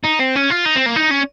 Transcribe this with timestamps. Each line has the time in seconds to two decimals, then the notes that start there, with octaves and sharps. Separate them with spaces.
0.05 D#4
0.20 C4
0.36 C#4
0.50 F4
0.65 D#4
0.75 C4
0.86 A#3
0.96 D#4
1.11 C#4